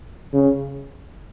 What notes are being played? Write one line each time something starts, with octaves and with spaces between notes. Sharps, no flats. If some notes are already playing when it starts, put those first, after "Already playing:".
C#3